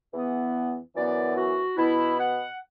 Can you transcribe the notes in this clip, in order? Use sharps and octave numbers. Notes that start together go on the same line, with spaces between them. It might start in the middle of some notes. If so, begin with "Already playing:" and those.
E2 E3 B3
F#2 E3 B3 D5
F#4
B2 B3 E4
F#5